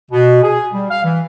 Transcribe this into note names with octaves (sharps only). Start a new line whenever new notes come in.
B2
G#4
G3
F5
E3